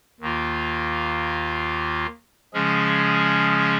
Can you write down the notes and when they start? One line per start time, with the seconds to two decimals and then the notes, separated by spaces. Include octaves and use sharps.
0.20 D#2 D#3 A#3 F4
2.54 C#3 F3 G#3 C#4 G#4